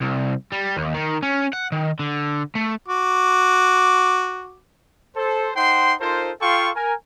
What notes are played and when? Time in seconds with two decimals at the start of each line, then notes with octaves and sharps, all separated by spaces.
0.01 C2
0.52 G3
0.77 D#2
0.94 D#3
1.23 C#4
1.53 F#5
1.72 D#3
1.99 D3
2.55 A3
2.88 F#4 D6
5.16 A4 C5
5.55 D#4 C5 F#5 G5 C6
6.00 D#4 F4 A4 A#4 C5
6.41 F4 A4 F5 G5 C6 C#6
6.75 A#4 G#5